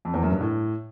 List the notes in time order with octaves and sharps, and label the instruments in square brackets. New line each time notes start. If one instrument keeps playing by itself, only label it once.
[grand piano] F2
E2
F#2
G2
A2